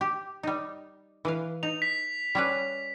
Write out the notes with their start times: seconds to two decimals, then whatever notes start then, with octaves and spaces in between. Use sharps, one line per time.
0.01 G4
0.43 G3 D#4
1.25 E3 B4 F5
1.63 D#4 F7
1.82 B6
2.35 G3 C#4 B4